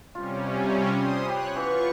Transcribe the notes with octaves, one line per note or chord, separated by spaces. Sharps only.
C3 G3 C#4 F4
C5 C6 D#6
G4 C#5 B5 F#6
E3 B3 F4 C#6